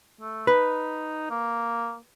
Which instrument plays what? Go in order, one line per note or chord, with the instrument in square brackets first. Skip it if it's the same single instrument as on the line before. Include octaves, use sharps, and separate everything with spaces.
[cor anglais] A3
[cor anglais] D#4 [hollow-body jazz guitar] B4
[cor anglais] A#3